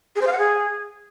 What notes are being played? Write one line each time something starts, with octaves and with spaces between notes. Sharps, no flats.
G#4
C5
F5
F#5
G#4